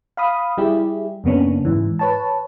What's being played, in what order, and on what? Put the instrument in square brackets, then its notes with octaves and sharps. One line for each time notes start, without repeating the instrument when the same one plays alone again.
[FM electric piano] F5 B5 D#6
G3 E4 G4 G#4
F#2 C#3 A#3 B3 C#4 D4
G#2 E3
B4 C#5 A5